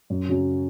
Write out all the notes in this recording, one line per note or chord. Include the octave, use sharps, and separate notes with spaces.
F#2
C#3 F#3 C#4